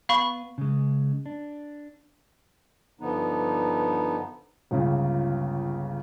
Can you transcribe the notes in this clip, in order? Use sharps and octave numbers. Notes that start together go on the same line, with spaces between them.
B3 F5 B5 C#6
C#3 G#3
D4
G2 D3 F3 B3 D#4
G1 C#2 C#3